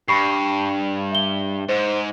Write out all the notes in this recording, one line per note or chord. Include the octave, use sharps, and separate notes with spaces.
G2 B5 C#6 C7
E5 G7
G#2 C5